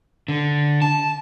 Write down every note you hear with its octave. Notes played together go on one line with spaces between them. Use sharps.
D3
A5